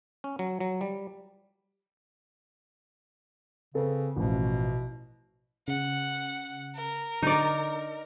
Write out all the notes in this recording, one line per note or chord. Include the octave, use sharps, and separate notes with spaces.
C#4
F#3
F#3
G3
C#3 C4 A4 B4
A1 B2 E3 F3
C#3 F#5
A#4
D3 D#4 D5